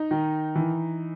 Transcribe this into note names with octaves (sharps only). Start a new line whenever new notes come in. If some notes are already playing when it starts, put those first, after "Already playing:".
Already playing: D#4
D#3
E3